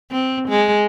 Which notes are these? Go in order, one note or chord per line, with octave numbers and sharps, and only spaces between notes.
C4
G#3